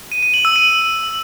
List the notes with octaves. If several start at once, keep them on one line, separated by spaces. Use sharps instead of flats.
D#7
D#7
F#7
E6
D#7